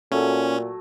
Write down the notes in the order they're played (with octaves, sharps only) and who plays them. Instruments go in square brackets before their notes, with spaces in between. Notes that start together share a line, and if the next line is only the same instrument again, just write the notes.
[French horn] A#2 [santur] F#3 A3 [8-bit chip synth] C#4 [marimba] A4